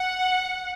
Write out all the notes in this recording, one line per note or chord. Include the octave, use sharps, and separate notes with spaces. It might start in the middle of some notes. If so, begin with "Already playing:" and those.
Already playing: F#5